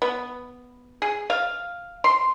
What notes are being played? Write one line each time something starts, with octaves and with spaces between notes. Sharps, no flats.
B3
G#4
F5
C6